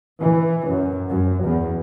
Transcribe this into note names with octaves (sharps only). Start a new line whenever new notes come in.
E3
F#2
F#2
E2